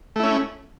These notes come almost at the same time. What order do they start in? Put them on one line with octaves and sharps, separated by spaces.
A3 E4 C#4